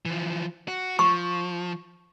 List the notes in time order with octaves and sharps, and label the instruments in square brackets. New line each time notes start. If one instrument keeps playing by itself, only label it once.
[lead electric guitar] E3 F3
F#4
[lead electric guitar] F3 [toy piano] C#6